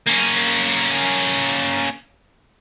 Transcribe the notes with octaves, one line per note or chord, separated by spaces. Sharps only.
A#3 C#4